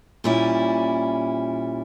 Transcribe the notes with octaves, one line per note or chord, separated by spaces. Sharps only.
A#2 G3 C#4 E4